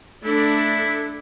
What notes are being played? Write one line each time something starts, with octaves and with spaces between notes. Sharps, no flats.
A3 D4 E4 A4